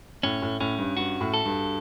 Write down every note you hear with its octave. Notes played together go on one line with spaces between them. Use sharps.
A2 C#4
A2
A2 C#4
G2
G2 F#4
A2
A4
G2